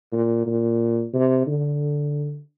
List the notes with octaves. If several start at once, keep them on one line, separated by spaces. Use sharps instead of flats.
A#2
A#2
C3
D3